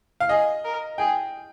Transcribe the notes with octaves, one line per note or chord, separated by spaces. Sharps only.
F5
G#4 D#5
A#4
G#4 G5